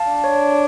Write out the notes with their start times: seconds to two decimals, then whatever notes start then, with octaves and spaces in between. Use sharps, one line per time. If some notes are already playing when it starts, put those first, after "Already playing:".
Already playing: F5 A5
0.09 D4
0.24 C#5